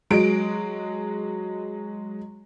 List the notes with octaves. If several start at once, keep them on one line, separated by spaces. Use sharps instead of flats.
F#3 G#3 D7